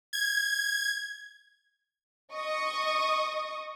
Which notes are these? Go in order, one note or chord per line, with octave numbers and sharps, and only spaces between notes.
G#6
D#5 C#6 D#6